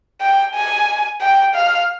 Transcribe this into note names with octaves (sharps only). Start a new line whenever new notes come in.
G5
G#5
G5
F5